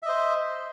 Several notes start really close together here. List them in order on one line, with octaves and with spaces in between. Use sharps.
E5 D#5 C5